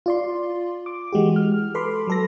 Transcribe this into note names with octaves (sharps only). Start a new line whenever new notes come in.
F4 D5 C6
D6
E3 G#3 F#4 G4
F6
A4 B4 B5 C6 D6
F#3 A4 A#6